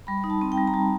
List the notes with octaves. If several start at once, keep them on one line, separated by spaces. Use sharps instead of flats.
G3 B5
D#4
A5
C4
G5
G3
A#5
G3 A5